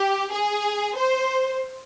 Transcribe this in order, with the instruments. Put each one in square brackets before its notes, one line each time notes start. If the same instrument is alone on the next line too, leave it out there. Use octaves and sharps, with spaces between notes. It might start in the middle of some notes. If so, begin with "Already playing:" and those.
Already playing: [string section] G4
G#4
C5